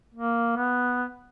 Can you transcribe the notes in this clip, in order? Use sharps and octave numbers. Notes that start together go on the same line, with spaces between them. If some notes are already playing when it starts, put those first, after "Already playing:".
A#3
B3